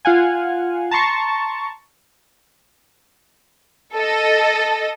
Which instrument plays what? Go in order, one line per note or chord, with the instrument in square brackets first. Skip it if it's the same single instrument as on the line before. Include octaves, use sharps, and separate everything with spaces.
[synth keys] F4 F5 F#5 G#5
A5 A#5 C6 C#6
[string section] A4 D#5